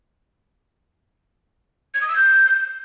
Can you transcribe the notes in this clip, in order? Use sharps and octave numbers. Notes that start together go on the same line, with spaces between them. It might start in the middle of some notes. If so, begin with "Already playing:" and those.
G#6
D#6
E6
G6